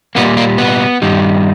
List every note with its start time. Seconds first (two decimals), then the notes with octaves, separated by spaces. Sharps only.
0.15 A#2 G3 A#3 B3
0.37 A#3
0.58 B3
1.02 G2 D#3 G3